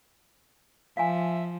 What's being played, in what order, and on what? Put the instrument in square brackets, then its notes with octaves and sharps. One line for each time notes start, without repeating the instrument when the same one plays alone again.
[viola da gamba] F3 [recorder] E5 [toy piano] F5 G#5